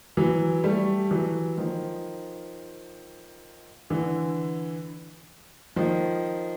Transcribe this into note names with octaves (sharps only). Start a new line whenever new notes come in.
E3 F#3
G3 A3
E3 F#3
D#3 F3
D3 E3
D#3 F3